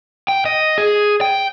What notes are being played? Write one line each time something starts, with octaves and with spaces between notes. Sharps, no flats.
G5
D#5
G#4
G5